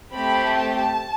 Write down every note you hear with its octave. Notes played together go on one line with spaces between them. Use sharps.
A3 C4 G4 B5
A5